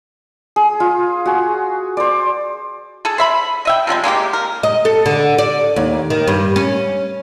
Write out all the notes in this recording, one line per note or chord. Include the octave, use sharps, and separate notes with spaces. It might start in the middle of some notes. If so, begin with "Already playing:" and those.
G#4
F4
F#4 G#4
C5 D5
G#4 A4
C5 E5 B5
D#5 E5 G5
C3 F3 F#3 G#3
G#3 A#3 D#4 G4
A#4
D#5
A4
D3
D5
D#2
D#3
G2
C#4